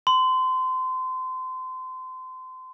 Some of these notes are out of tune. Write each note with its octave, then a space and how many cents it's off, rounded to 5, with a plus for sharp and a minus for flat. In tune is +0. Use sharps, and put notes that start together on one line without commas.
C6 -30